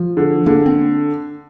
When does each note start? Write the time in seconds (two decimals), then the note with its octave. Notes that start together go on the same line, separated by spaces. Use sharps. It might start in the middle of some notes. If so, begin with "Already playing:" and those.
Already playing: F3
0.17 D3
0.46 D3 A#3
0.66 C4